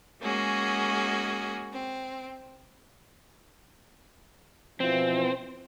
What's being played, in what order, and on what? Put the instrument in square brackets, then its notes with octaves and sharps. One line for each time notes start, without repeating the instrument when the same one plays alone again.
[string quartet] G#3 A#3 C#4 F#4 G#4
C4
[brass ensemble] B2 E3 F3 [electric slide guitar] C4